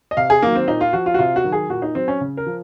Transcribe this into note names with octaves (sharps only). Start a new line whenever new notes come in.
D#5
C3 F5
G#4
D#3 F#3 A#3
C4
A#2 D#4
F4
F3 F#4
F4
F#4
C3 F4
F#4
D#3 F#3
G#4
A#2 F#4
D#4
F#3 C4
C#4
C#3
A#4
F3